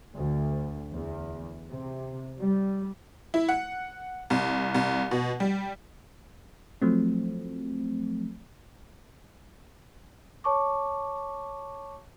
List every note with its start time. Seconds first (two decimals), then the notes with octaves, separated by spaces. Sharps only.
0.15 D2
0.93 E2
1.71 C3
2.39 G3
3.34 E4
3.49 F#5
4.30 C2
4.75 C2
5.11 B2
5.40 G3
6.82 F3 F#3 A3 C4
10.44 C#5 A5 C#6 D6